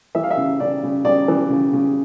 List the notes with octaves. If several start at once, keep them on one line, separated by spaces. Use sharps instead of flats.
E3 E5
F5
E5
C#3
C#3 D5
C#3
C#3 D5
E3
C#3
C#3